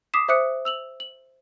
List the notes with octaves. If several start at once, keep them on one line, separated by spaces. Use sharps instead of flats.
D6 D#6 B6 C7 E7
C5 E5 D6 D#6 F#6 C#7
E6 F7 F#7
F#7